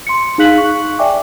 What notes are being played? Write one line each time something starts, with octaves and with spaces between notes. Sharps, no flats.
C6 C#7
D#4 G#4 F5 F#6 B6 F#7
C#6
D5 E5 G5 G#5 D6